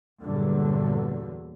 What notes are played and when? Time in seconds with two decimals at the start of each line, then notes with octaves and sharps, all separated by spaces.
0.22 E2 G2 A#2 D3 F#3